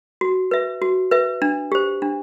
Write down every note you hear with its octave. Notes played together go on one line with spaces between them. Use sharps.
F#4
B4 E5
F#4
B4 E5
D4
G4 C5
D4